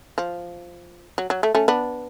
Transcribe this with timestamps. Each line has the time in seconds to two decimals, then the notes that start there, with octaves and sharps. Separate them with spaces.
0.18 F3
1.18 F#3
1.30 F#3
1.43 A3
1.55 A3 C#4
1.68 B3 D4